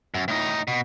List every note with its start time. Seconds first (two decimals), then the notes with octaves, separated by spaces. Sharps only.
0.14 F#2
0.28 A2 D#4
0.68 B2